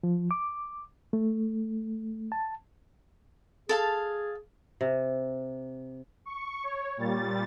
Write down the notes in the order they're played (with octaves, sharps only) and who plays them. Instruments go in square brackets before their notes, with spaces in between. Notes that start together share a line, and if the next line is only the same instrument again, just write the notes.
[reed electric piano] F3
D6
A3
A5
[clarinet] G#4 [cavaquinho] A4 F5 A5
[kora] C3
[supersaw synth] C#6
C#5
A#2 G3 A6